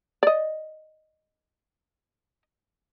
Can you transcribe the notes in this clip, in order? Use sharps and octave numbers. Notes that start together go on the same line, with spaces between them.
D5 D#5